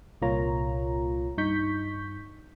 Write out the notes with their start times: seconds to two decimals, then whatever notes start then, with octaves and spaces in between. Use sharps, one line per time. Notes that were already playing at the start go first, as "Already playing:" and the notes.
0.22 C2 A#2 A#3 F4 C#5 A#5
1.38 G2 D#4 C#6 G6 B6